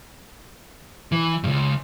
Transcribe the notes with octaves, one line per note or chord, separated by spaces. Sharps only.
E3
C#2 G2